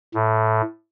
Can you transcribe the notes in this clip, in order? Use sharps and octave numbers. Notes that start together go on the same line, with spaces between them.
A2